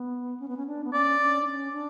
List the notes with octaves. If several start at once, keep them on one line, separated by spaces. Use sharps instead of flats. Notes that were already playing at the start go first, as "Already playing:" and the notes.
Already playing: B3
C#4
B3
C#4
D4
B3
C#4 D5
C#4
D4
C#4
D4